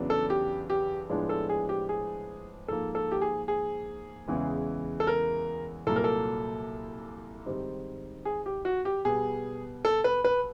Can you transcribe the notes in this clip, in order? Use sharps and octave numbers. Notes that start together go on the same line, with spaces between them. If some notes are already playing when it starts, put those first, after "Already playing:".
Already playing: E2 C#3 F#3 B3 D4
A4
G4
G4
A2 F3 G#3 B3 D4
A4
G#4
G4
G#4
G#2 F3 A#3 A4
A4
G4
G#4
G#4
E2 C#3 E3 G#3
A4
A#4
C2 A#2 F#3 A#3 A4
A#4
A4
G#2 D#3 G3 C4 D#4
G#4
G4
F#4
G4
B2 G3 B3 G#4
A4
B4
B4